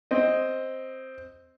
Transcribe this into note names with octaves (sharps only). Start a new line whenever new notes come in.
C4 D#5